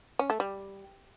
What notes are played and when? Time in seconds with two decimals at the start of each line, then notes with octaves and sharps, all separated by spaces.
0.19 C#4
0.30 A3
0.40 G3